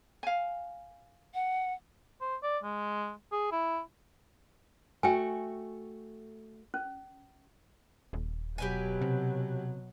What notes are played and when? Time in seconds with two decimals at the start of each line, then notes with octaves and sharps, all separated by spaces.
0.23 F5 G#5
1.34 F#5
2.21 C5
2.43 D5
2.64 G#3
3.32 G#4
3.52 E4
5.03 A3 F#4 G5 G#5
6.74 C#4
8.13 D#1
8.58 B2 F#3 G4 B4 G#5
9.01 C3